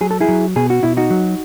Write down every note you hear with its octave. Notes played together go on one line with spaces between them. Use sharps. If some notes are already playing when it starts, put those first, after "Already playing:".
F#3 G#4
A4
E4 G#4
F#3
B2 G#4
F#4
B2 E4
D#4 F#4
F#3